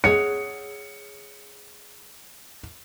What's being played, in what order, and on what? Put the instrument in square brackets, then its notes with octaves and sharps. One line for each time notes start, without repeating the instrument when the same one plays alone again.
[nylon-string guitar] G#4 C#5 F#5 [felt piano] C#7